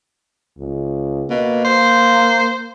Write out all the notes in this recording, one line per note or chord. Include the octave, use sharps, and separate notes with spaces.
C#2
B2 A#3
C5